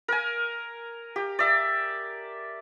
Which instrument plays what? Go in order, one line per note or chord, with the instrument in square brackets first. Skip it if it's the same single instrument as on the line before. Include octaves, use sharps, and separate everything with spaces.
[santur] A#4 G#5
G4
D5 E5